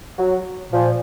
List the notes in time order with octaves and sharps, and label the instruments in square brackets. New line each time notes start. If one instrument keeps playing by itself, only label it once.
[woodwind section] F#3
[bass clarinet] A#2 [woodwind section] F3